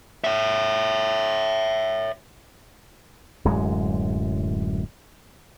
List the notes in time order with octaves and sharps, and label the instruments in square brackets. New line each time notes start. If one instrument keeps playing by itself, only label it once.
[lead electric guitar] C#5 E5
[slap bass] D1 F#2 G#3